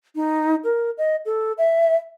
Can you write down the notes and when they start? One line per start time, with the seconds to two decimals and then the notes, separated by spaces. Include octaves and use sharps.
0.16 D#4
0.64 A#4
0.98 D#5
1.26 A4
1.58 E5